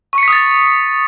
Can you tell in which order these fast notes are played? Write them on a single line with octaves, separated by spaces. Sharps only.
C#6 C#7 B6 D#6 A6